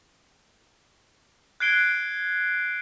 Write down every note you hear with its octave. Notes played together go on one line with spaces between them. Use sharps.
F#6 G#6 C7 D7 G7